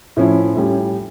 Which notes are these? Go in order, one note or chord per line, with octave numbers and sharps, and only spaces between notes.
A2 F3 C#4 E4
A2 G3 C#4 G4